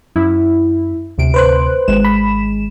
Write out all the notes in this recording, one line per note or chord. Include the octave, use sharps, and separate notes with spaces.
F#2 E4
D2 C3 D7
B4 C5 F#6
G#1 G#3 E7
B5